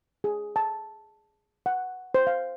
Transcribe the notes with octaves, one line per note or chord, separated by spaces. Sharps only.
G#4
A5
F#5
C5
F5